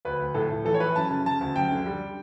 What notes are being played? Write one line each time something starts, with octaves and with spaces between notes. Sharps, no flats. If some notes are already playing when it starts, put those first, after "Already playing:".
D2 B4
D2
A2 A4
A2
E3 A4
C#5
E3 B4
F#2 A5
C#3 A5
C#3 A5
D2
F#2 G5
D3
G3